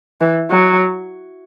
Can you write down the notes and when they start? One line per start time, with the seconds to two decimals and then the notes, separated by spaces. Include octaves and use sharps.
0.21 E3
0.51 F#3